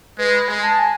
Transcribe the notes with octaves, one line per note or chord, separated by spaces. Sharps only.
G#3 B4
G#3 G#5
A5
G#5